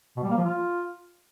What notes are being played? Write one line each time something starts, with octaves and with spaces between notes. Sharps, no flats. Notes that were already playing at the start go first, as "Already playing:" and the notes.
B2
G3
A#3
F3
F4